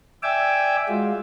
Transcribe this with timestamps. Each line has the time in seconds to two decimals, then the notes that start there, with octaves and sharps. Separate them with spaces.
0.23 D5 E5 G5 G#5 D6 E6
0.88 G#3 F4 F#4